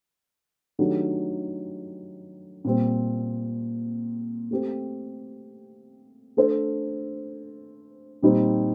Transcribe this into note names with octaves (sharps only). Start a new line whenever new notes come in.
D#3 F#3 A3 D4 G4
A#2 G3 C4
A3 C4 G4
A3 D4 A4 C5
A#2 G3 C4 D#4